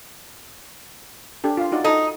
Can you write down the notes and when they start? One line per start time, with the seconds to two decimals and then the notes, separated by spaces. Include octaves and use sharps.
1.44 D4 G4 A4
1.57 F4 F5
1.72 D#4 F#4 D5
1.84 D#4 A4 D#5